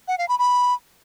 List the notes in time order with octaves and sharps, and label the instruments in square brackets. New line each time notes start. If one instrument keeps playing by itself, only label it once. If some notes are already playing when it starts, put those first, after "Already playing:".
[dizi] F#5
F5
B5
B5